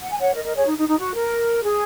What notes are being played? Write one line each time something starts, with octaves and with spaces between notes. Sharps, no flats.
F#5
G#5
C#5 F#5
A#4 D#5
A#4 D#5
G#4 C#5
D#4
D#4
D#4
F#4
A#4
G#4